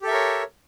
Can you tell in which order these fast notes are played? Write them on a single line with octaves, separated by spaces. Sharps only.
G4 A4 E5 A#4 C#5